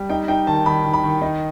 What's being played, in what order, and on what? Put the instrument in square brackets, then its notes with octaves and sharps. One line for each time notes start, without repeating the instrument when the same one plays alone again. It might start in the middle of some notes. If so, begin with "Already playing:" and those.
Already playing: [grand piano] G3
D#4 G5
D#4 G5
D#3 A5
D#3 B5
D#3
B5
D#3
D#4